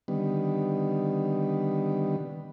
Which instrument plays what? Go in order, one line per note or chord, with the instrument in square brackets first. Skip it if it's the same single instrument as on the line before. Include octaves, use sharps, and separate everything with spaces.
[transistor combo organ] D3 D#3 G3 B3